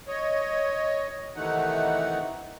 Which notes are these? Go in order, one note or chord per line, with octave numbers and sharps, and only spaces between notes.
C#5 D#5
C3 D#3 E3 A3 D#4 F#5